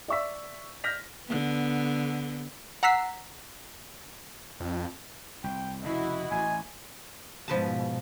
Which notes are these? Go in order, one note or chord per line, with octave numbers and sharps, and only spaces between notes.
D5 E5 C#6 E6 B6
F6 G6 A#6 B6 F7
D3 B3
F#5 A#5 E6 B6 C7
F2
C2 G5
F1 C#3 E4 F#4 D#5
A1 G#5
G#2 B2 F3 B4 A5